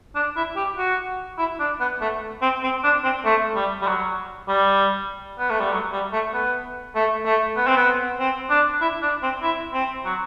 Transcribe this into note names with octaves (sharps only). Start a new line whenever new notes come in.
D4
E4
G4
F#4
E4
D4
B3
A3
C4
C4
D4
C4
A3
G3
G3
F#3
G3
B3
A3
G3
F#3
G3
A3
B3
A3
A3
B3
C4
B3
C4
D4
E4
D4
C4
E4
C4
F#3